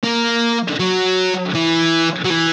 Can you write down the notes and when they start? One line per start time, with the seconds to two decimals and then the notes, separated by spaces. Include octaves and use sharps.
0.04 A#3
0.80 F#3
1.55 E3
2.25 F#3
2.30 E3